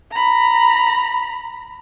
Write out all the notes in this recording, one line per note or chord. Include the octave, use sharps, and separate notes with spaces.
A#5 B5